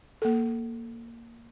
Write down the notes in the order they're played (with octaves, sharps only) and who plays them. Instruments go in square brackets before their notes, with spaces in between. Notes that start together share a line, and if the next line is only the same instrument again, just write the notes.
[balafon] A#3 A4